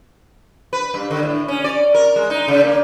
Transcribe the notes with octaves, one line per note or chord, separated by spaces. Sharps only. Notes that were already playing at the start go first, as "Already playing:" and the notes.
B4
G2
D3
A2
C#4
D5
A#4
G#3
D#4
C#3
A#3